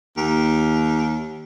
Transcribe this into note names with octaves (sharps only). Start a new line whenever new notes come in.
D#2